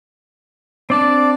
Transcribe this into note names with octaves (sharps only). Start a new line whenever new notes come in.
C4 D4 D5 A5